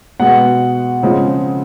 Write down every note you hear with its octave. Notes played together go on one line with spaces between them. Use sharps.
B2 G#3 B3 F#5
C#3 F3 G#3 C4